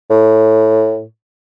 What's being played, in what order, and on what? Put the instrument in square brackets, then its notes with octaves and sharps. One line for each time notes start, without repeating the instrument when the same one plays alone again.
[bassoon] A2